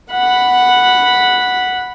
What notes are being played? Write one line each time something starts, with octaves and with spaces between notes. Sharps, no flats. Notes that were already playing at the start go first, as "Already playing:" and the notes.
F#5 B5